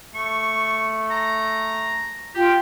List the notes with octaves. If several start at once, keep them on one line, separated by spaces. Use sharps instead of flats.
A3 C#6
A#5
F4 G4 G5